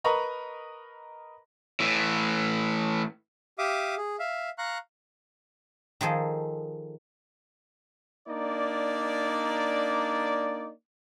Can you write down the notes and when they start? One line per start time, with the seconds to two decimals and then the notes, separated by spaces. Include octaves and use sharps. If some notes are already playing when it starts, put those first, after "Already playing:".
0.04 A#4 B4 D#5 A#5 B5 C#6
1.80 A2 E3
3.58 G4 E5 F5 D6 D#6
3.97 G#4
4.19 E5 F5
4.58 F5 A#5 C#6 F#6
6.01 D#3 F3 G#4 A4
8.28 A#3 D4 D#4 D5